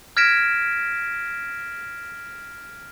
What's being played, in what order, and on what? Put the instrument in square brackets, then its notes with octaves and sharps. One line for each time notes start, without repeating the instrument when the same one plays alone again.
[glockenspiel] F6 G#6 A#6 B6 D7 E7